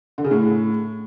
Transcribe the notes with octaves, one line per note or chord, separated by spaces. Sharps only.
D3
C#3
A2